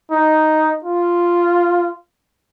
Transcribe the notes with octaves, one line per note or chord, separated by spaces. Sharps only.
D#4
F4